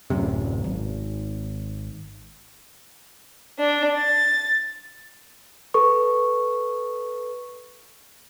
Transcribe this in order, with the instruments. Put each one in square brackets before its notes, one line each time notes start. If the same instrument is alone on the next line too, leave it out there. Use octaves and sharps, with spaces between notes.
[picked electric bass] D1 F#2 C3
G#1
[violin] D4
A6
[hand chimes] A4 B4 C#6